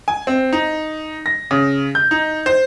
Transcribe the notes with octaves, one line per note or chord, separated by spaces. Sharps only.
G#5
C4
D#4
A#6
C#3
G6
D#4
C5